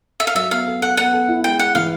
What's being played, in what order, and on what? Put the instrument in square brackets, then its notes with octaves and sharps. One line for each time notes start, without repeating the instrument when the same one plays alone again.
[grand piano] A4 [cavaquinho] E5
[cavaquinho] F5
[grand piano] F#3 [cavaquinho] E5
[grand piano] B3 [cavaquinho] F5
[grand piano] A4
[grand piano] A4 [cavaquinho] F#5
[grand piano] B3 [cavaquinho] F#5
[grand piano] A4
E4
[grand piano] G#3 [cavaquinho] G5
[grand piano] G#3 [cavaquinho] F#5
[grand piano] E3 [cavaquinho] F5